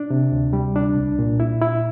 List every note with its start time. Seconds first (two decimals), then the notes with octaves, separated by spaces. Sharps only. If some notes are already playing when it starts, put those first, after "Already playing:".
Already playing: D4
0.10 C3
0.32 D2
0.53 G3
0.76 D4
0.97 C2
1.19 A#2
1.40 E4
1.62 E4